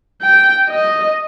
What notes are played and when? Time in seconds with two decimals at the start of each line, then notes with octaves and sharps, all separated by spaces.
0.22 G5
0.71 D#5